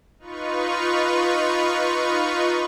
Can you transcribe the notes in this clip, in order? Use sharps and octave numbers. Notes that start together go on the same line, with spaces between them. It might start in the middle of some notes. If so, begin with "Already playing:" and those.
D#4 F4 B4 C#6